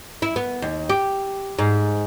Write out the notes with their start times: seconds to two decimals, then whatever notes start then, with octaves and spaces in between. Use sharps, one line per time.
0.22 E4
0.36 B3
0.62 D#2
0.89 G4
1.59 G#2